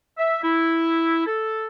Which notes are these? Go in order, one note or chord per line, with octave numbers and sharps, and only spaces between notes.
E5
E4
A4